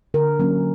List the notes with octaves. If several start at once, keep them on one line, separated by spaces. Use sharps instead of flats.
D3 A#4
F#3 A#3 C#4